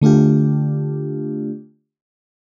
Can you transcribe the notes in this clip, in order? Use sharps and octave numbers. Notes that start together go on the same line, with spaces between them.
D3 A3 D4 F4 G4